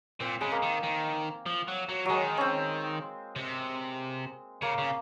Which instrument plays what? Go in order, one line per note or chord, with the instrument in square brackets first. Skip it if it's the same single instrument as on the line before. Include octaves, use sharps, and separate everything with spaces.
[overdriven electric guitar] A#2 [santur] C4
[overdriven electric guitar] C#3 [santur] G#3
[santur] A#3
[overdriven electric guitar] D#3
D#3
F3
F#3
F#3
[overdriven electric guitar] D#3 [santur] F#3 G#3
[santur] C4 C#4
[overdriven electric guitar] C3
[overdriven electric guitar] C#3 [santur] A#3
[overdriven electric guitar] C#3